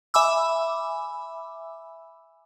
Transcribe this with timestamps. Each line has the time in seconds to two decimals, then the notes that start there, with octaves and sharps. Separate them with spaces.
0.14 E5 G#5 B5 D6 E6